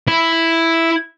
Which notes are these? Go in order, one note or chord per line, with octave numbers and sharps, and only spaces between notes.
E4